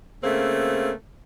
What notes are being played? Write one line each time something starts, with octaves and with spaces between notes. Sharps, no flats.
C#3 A3 A#3 C4